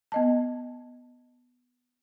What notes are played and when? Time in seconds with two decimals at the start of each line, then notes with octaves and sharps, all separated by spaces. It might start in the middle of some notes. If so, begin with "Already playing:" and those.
0.12 B3 D#5 A5